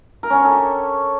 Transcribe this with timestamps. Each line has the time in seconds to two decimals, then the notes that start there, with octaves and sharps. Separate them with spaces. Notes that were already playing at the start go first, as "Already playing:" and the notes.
0.23 A#4
0.30 C#4
0.38 C#5
0.45 A4
0.52 G4